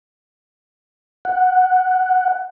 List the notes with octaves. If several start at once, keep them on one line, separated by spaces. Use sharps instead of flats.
F#5